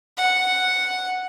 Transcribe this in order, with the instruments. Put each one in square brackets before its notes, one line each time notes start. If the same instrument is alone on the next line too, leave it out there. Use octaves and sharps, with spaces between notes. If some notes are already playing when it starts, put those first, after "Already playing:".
[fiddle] F#5